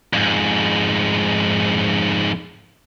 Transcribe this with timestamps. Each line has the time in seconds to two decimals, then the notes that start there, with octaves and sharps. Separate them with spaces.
0.13 F2 G#2